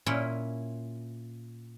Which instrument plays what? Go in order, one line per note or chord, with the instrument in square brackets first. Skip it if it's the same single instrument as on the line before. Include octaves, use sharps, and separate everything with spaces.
[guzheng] A#2 C#4 E4